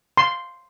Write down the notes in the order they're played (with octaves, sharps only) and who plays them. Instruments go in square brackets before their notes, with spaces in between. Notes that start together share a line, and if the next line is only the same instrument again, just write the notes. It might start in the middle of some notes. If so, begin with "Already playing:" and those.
[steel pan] C6